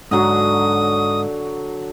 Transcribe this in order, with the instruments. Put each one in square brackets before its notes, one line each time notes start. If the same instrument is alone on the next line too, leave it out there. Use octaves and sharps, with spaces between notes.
[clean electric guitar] G#2 [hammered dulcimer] D3 F#3 [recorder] D#6